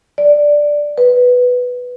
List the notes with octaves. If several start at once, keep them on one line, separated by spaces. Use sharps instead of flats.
D5
B4